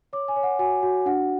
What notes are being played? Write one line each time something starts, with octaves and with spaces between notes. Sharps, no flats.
C#5 D6
G#5
C#5
F#5
F#4 G#5
F#4
D4 F#5